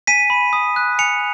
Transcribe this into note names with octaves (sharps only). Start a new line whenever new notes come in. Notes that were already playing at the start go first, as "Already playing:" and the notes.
G#5 B6 D#7
B5
D#6
F#6
G#5 C#7 F7